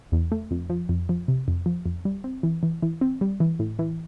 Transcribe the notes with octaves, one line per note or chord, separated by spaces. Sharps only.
E2
A3
F2
F3
F2
F3
C3
F2
F3
F2
G3
C4
E3
E3
E3
C4
G3
E3
A2
E3